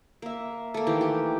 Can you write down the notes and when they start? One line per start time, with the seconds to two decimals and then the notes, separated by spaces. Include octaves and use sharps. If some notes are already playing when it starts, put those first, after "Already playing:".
0.22 A#3 E5
0.74 A3 A#3
0.87 D#3 E3 G4
1.01 G4